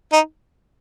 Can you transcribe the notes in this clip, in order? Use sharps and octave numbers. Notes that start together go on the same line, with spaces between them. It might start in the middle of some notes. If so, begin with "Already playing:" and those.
D#4